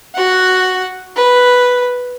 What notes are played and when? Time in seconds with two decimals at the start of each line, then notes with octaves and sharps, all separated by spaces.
0.16 F#4 F#5
1.16 B4